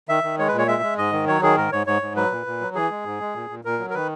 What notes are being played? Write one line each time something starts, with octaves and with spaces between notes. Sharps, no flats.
D#3 E5
D#3
G#3 C#5
B4
A#2
C#5
G#3 E5
G#3
G#2 D#5
D#3
F#3 C#5
D#3 G#4
G#2 A#4
G#2 C#5
G#2 C#5
G#2
F#3 B4
A#2
A#2
F#3
E3 G#4
G#3
G#2
G#3
A#2
A#2
A#2 A#4
F#3
A#4
D#3 B4